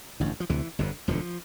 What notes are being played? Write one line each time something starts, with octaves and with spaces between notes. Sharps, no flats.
A1 G2 D3
F3
D2 C3 E3
G1 F2 D3
E1 D2 D3 F3